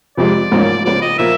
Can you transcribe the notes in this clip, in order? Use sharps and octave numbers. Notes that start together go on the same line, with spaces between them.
F2 C3 F3 G#3 D5
A1 G#2 F3 A#3 C#4
C#2 C#3 F3 D5
D#5
A#2 F3 A#3 E5